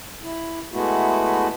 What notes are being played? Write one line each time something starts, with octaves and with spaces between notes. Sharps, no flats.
E4
G#3 A3 B3 E4 F#4